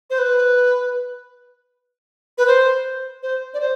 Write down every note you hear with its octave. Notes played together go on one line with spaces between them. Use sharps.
C5
B4
B4
C5
C5
D5
C5